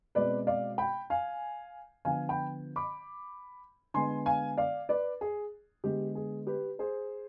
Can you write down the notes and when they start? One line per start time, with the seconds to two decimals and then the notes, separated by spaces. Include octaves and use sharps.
0.15 B2 G#3 C4 B4 D5
0.47 D5 F5
0.78 G5 B5
1.10 F5 G#5
2.05 D3 F3 B3 F5 G#5
2.29 G5 B5
2.76 B5 D6
3.94 D3 G#3 B3 G#5 C6
4.26 F5 G#5
4.57 D5 F5
4.89 B4 D5
5.21 G#4
5.84 D3 G#3 B3 G4
6.15 G#4
6.47 G4 B4
6.79 G#4 C5